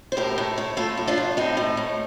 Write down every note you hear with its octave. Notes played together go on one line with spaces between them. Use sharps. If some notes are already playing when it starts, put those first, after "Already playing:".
C5
A2 G4 A#4
A2
A2
A2 F4 A4
A2
D4 F4
A2
A2 C4 D#4
A2
A2